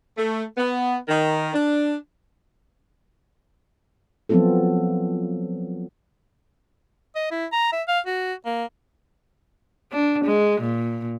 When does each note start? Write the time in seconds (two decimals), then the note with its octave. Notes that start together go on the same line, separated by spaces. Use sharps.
0.17 A3
0.57 B3
1.08 D#3
1.54 D4
4.29 F3 F#3 B3 C4 F4 A4
7.15 D#5
7.31 E4
7.52 A#5
7.72 E5
7.88 F5
8.06 F#4
8.45 A#3
9.92 D4
10.25 G#3
10.61 A#2